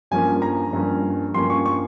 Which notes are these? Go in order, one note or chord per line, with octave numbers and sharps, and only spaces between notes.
G2 F3 A#3 C#4 G#5
A#5
G2 F3 A#3 C#4
G2 F3 A#3 C#4 C6
C#6
C#6